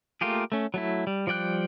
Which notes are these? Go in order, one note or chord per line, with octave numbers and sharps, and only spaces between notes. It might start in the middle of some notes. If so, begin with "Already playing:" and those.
A3 A#3 F4 G4 G#4
A3 C#4
F#3 A3 E4
G3
F3 G3 D5 G5 F#6